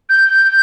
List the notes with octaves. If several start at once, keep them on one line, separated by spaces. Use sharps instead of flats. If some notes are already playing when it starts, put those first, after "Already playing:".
G6